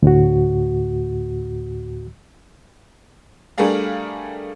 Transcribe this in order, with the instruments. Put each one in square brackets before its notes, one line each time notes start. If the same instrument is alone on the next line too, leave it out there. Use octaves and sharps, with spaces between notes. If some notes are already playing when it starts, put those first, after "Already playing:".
[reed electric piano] D2 A2 F#4
[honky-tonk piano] G3 A3 D4 G#4 A#4 F5